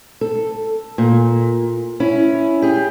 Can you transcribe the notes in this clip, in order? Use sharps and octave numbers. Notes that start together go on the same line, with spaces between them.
A4
A#2
C#4 E4
G4 G#4